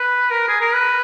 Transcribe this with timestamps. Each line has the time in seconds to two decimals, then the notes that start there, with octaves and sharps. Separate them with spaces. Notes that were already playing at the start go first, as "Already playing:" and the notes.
Already playing: B4
0.31 A#4
0.48 G#4
0.60 A#4
0.74 B4